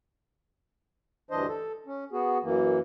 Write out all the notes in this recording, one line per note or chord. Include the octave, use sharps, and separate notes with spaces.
D2 G2 E3 D4 C5 D#5
A4
C#4
B3 F#4 G#4
F#2 E3 A#3